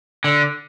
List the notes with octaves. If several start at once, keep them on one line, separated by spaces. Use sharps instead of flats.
D3